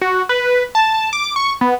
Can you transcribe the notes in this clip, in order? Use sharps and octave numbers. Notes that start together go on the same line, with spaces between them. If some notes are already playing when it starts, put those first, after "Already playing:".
F#4
B4
A5
D6
C#6
B3